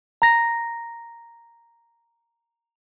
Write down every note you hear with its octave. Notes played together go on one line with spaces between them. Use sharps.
A#5 A#6